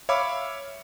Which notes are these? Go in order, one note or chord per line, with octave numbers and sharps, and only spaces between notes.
C#5 E5 F5 B5 D6